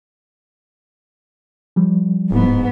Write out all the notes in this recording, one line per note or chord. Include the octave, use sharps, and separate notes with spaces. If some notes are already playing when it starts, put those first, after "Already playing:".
F3 G3
D1 G#2 B3